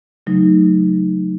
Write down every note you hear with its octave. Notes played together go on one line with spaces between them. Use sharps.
C#3 F#3 A3 D#4